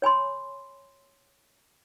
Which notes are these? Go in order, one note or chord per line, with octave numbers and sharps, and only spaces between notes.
C#5 G#5 B5 C6